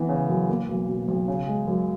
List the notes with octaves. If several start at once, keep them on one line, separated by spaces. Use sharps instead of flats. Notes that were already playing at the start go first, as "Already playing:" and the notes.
Already playing: E3 B3
C#3
F#2
A#3
B1
B2
B1
C#3
G#3
F#2